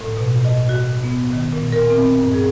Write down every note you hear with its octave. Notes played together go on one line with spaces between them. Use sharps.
A2
B2
D#5
F#4
B3
D#3
A#2
A#4
C4
G2
G#4